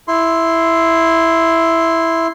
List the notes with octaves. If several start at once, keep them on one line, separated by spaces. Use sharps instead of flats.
E4 C6